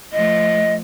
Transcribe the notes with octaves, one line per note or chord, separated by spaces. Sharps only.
F3 A3 D#5